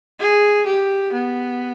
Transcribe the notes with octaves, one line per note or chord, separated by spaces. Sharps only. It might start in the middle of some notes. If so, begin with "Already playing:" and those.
G#4
G4
B3